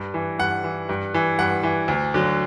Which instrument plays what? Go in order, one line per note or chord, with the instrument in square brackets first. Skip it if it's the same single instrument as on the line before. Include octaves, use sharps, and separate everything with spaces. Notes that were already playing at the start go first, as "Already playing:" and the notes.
Already playing: [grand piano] G2
E3
G2 F#5
E3
G2
E3
G2 F#5
E3
D2
D3 F#3